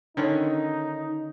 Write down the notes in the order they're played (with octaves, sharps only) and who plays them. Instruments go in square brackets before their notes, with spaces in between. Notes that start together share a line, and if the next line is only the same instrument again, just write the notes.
[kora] D3 D#3 C#4 [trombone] D#4